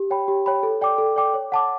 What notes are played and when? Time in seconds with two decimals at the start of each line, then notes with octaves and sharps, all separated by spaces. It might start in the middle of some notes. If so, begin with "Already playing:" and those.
Already playing: G4
0.10 C#5 G5 B5
0.28 G4
0.46 C#5 G5 B5
0.63 A4
0.81 D5 G5 D6
0.98 A4
1.16 D5 G5 D6
1.34 C#5
1.52 F#5 A5 D6